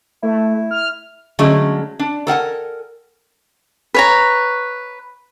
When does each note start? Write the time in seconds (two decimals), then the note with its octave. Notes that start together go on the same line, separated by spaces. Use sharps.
0.23 A3 E4
0.71 F6
1.39 D3 F#3 G#3 A3 C#4
1.99 D4
2.27 A4 A#4 F#5 G#5
3.94 B4 C#5 A#5